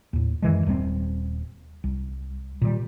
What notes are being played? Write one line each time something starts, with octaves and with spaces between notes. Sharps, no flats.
D#2 A2
F#2 D#3 E3 G#3
D#1 G3 B3 C4
C2
A#2 D#3 G3